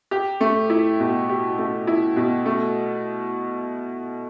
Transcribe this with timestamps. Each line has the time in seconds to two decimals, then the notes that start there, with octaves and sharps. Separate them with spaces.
0.11 G4
0.40 A3
0.70 E4
1.00 B2
1.29 G4
1.58 A3
1.87 E4
2.16 B2
2.46 A3